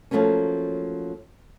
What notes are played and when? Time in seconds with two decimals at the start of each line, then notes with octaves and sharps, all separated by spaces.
0.11 F3 F#3 A3 A#3 C#4